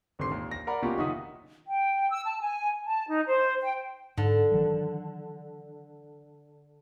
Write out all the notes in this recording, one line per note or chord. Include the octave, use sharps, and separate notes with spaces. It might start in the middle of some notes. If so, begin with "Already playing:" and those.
G#1 D3 C4 G4 C6 C7
D#2 A#2
A#6
A#4 D5 F#5 A#5 B5
B2 A#3 C#4 F4 G4
F#1 D#3 D#4 E5 F#5 D#6
G5
E6
A5
G#5
A5
D#4
C5
G5
G#2 D3
D#3 E3 F#3